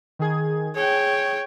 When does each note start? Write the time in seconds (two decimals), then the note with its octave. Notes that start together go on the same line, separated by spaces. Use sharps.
0.19 D#3 G#4 G#6
0.76 G#4 C#5 G5